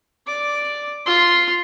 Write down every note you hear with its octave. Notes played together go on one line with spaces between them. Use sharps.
D5 D6
F4 C6